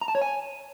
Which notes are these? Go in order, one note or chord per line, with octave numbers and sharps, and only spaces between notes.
A#5
A5
C#5
G#5